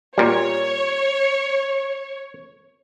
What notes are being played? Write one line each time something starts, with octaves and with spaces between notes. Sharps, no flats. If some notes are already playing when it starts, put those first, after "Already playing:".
A#2 G3 C#5